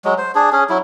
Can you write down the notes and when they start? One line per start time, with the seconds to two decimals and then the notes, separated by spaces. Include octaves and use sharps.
0.05 F#3 G#3
0.18 C5
0.35 D4 G#4
0.52 C#4 G#4
0.69 F#3 E4